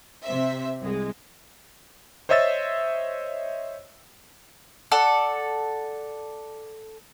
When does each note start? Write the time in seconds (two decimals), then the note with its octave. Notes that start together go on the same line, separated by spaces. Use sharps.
0.24 C3 C5 E5
0.81 C2 G#3
2.29 C5 C#5 D#5 E5 E6 A6
4.92 A4 D5 F#5